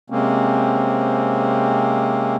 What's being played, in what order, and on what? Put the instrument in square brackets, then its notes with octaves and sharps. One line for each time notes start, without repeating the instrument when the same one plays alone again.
[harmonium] C3 G#3 A#3 C4 C#4